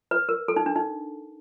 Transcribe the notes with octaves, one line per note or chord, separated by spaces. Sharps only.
B4
A#4
A4
D#4
D4
D#4